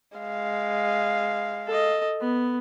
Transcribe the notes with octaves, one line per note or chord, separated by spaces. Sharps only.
G#3 F5
A4 D#5
B3